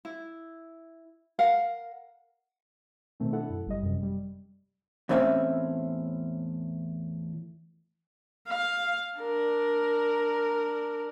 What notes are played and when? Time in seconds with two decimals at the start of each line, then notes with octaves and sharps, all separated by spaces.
0.05 E4
1.39 A#4 F5 F#5
3.20 B2 D#3 A3 C4
3.32 D4 E4 A4 F#5
3.49 F#2
3.66 G1 G3 D#5
3.83 F#2 C3
4.03 G3
5.09 E2 A2 C4 C#4 E5
8.47 F5
9.19 D4 A#4